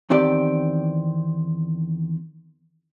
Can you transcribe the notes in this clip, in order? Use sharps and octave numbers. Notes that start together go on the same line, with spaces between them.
E2 D#3 C4 G4 D5